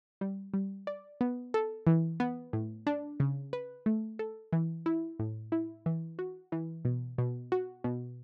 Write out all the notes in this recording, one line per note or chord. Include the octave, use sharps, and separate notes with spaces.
G3
G3
D5
B3
A4
E3
B3
A2
D4
C#3
B4
A3
A4
E3
E4
A2
E4
E3
F#4
E3
B2
B2
F#4
B2